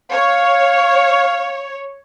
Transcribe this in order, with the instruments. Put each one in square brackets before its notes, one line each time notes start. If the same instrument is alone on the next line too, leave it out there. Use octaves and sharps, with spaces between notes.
[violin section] C#5 [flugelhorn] F5